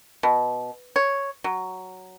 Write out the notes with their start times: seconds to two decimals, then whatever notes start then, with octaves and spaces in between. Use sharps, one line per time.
0.23 B2
0.96 C#5
1.44 F#3